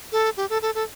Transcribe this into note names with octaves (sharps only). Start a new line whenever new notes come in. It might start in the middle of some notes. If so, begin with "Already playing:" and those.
A4
G4
A4
A4
A4